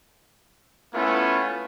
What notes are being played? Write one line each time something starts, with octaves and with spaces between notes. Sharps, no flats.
A3 B3 C#4 E4 F4